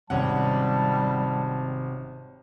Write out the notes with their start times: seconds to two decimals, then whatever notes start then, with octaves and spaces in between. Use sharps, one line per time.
0.10 G#1 C3 G3 C#4 F#5 A5